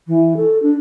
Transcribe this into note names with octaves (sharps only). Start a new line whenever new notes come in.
E3
A4
D4